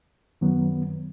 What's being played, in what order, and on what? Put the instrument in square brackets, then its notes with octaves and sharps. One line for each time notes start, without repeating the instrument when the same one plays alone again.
[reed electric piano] F#2 D#3 F#3 B3